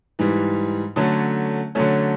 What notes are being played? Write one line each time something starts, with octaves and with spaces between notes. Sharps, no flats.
G#2 E3 G3
D3 F#3 A3 C#4
D3 F#3 A3 C#4